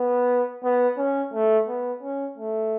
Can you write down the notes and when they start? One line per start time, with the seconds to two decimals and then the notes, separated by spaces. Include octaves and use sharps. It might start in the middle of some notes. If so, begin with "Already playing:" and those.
Already playing: B3
0.63 B3
0.98 C#4
1.33 A3
1.68 B3
2.03 C#4
2.38 A3